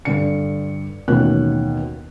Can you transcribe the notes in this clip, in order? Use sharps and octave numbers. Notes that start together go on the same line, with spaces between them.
G2 D3 D5 C#7
A1 D#2 B2 C#5 F#6